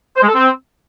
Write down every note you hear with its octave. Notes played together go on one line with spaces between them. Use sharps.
C5
G#3
A4
C4